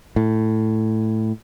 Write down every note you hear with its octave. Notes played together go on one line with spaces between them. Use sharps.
A2